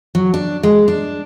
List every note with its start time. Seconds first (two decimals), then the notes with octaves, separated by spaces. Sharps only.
0.15 F#3
0.34 D4
0.63 G#3
0.88 D4